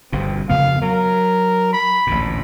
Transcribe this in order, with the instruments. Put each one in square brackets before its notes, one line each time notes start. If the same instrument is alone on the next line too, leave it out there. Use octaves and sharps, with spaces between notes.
[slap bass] G1 G2 B2 [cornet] C4
[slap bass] F2 C#3 B3 [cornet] F5
[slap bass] F#3 [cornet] A#4
[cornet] B5
[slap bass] A1 D2 A#2